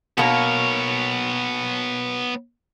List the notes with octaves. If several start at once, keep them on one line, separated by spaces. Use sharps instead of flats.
B2 A#3 B3 C#5